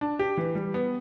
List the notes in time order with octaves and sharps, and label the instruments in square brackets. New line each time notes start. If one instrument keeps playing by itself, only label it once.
[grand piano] D4
G4
E3
G3
B3